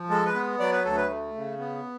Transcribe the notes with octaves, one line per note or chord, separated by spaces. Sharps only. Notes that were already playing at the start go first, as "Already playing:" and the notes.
Already playing: F3
G#3 A4
B4
B3
F#3 D5
B4
D2 A4
B4
A3
C#3
B3